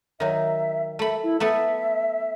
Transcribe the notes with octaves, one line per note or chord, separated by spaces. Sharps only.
D#3 F#3 E5
A3 E5 B5
E4
A3 B3 A4 E5